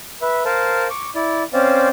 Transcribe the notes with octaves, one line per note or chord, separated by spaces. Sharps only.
B4 E5
A#4 C5 F5 A5
C#6 D6
E4 D5
C4 C#4 C5 D5 F5